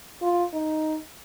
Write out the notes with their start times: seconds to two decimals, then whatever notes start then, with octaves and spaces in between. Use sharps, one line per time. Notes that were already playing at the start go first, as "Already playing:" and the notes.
0.22 F4
0.53 D#4